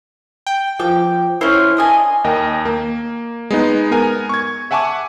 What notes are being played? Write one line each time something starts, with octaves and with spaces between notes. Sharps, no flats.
G5
F3 G5 D6
C#4 E4 C5
D4 D#5 G#5
D#2 A#4 D#5 G5
A#3
G#3 B3 D#4
B3 A#4 G#5
C#6 G#6
E5 F#5 G#5 A5 C#6 D6